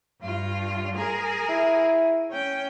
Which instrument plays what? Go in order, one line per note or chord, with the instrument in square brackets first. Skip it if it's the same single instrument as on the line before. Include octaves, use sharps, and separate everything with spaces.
[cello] G2 F4
G#4 A#4
[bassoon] E4
[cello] C#4 G5